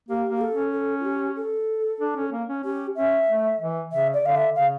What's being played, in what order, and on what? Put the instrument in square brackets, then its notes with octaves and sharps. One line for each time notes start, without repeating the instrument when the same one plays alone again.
[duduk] A#3 [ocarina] G4
[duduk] A#3
[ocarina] G4
A4
[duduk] C#4
[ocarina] A4
F4
G4
A4
[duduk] D4
C#4
A#3
C#4
[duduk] C#4 [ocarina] G4
[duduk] C#4 [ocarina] E5
[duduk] A3
E3
[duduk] C#3 [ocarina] E5
[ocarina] D5
[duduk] D3 [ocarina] F5
[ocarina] E5
[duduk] C#3 [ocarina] F5